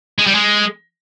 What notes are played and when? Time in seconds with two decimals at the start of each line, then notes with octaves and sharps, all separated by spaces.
0.19 G#3
0.27 G3
0.35 G#3